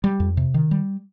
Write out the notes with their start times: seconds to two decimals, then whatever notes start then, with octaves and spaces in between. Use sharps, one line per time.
0.04 G3
0.20 F2
0.37 C3
0.54 D#3
0.71 G3